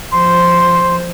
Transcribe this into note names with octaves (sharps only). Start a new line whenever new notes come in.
F3 C5 C6